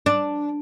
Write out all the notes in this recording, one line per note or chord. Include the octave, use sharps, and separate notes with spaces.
D4